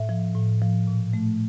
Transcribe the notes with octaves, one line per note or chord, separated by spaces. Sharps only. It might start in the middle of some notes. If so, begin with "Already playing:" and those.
Already playing: A2 E5
F3
A2
F3
A#2
A3